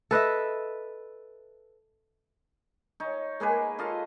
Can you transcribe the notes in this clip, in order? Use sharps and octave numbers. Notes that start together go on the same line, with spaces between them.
A4 B4 D#5 E5
D#4 C#5
G#3 A#3 G#4 B4
F4 A4 D#5 F5